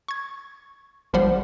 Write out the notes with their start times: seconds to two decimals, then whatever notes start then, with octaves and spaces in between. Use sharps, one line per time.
0.08 C#6 G#6
1.13 G#1 F3 G3 C5 F#5 B5